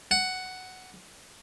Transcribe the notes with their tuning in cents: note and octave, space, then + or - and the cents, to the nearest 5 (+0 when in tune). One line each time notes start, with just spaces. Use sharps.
F#5 +5